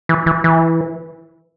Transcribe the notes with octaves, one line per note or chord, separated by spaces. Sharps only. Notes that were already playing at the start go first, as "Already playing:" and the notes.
E3
E3
E3